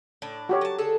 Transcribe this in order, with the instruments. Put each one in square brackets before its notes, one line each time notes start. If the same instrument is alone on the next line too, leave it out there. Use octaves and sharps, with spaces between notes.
[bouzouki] A2 D4
[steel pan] F#4 G4 C#5
[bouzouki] F#3 A5
D3 G#4 A4